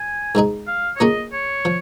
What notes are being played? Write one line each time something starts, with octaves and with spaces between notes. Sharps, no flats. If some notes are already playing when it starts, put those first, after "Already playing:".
Already playing: G#5
G#2 G#3 D#4 G#4
F5
C#5
A#2 A#3 C#4 G#4 D#5
C#5
F3